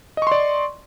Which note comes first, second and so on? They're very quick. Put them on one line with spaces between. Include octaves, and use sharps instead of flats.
D#5 C#6 C6 D5